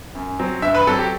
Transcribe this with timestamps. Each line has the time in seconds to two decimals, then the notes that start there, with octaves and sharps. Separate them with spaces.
0.15 F#2
0.39 F#3 C4
0.62 G2 E5
0.75 B4
0.87 F#3 C4 A4
0.99 G4